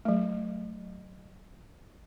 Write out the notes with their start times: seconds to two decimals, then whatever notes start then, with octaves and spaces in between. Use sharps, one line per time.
0.05 F#3 A3